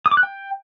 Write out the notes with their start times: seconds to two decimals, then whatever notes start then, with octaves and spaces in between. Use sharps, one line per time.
0.06 D#6
0.11 D6
0.17 F#6
0.23 G5